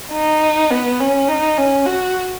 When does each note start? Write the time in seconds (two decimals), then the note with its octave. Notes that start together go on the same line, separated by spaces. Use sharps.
0.12 D#4
0.70 B3
1.00 C#4
1.28 D#4
1.57 C#4
1.86 F#4